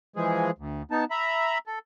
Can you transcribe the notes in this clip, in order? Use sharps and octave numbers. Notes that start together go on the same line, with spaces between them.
E3 F3 G#3 G#4
D2
B3 D#4 A5
E5 A#5 B5
A4